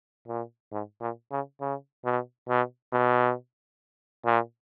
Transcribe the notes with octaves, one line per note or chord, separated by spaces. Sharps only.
A#2
G#2
A#2
C#3
C#3
B2
B2
B2
A#2